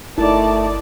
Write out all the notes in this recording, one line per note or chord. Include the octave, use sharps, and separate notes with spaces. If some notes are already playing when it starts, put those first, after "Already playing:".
G1 A3 D#4 E4 A#4 D5 A5